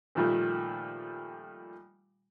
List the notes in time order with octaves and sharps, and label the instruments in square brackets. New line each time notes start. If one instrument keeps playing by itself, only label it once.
[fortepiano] A#2 D#3 F3 G3 A3